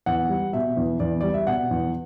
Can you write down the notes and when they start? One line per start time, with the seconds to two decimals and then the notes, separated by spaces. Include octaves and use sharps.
0.06 E2 F#5
0.29 G3
0.53 B2 E5
0.77 E2
1.00 E2 D5
1.21 G3 D5
1.34 E5
1.47 B2 F#5
1.71 E2